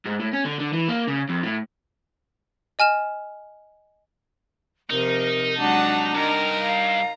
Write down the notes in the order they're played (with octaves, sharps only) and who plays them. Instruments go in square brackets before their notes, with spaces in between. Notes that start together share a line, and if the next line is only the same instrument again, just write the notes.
[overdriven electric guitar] G#2
A2
C#4
D3
D3
E3
A#3
C#3
F2
A2
[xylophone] D#5 G#5 F6 E7
[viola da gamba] C3 F3 [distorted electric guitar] D#4 [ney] A#4
[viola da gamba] F#3 G#3 [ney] D4 [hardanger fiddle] F#5 A5
[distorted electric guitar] G2 [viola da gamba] D#4 A#4 [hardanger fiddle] A#5
[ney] F5